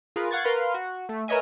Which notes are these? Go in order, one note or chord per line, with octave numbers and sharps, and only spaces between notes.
F4 G#4 A#4 B4
F5 F#5 C#6 G#6 A6
A#4 B4 F5 C6
F#4
A3
A#4 B4 C#5 D#5 E5 G#5